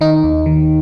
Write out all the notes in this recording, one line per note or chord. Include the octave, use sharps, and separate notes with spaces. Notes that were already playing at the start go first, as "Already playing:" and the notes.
D#3 D#4
D#2
D#3